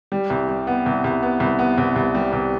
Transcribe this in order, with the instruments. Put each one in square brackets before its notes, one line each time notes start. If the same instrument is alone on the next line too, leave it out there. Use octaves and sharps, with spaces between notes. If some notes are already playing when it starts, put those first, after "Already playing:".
[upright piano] G3
C2
G3
B3
C2
C2
B3
C2
B3
C2
C2
G3
C2